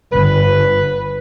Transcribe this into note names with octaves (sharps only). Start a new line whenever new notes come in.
G1 B4